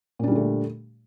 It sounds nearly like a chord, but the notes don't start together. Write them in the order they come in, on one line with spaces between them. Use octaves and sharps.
A#2 D4 G3 D3 A3